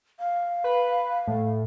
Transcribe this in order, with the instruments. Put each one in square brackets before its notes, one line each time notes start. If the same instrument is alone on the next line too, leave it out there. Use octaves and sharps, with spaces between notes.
[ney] F5
[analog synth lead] B4
A2